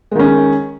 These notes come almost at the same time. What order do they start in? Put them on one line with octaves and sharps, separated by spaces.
G#3 D#3 C#4